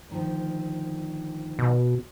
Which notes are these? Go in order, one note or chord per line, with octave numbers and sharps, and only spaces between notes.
D2 D#3 F3
B2